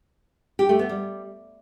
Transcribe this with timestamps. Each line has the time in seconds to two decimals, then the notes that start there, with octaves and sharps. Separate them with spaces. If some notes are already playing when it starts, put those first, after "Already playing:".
0.59 G4
0.69 A3
0.79 B3
0.89 G3